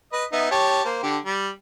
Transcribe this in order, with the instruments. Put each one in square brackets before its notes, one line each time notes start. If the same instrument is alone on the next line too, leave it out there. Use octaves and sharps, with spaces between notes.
[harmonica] B4 D#5
B3 D#4 E5
G4 C#5 A5
A#3 C5
D3 G4
G3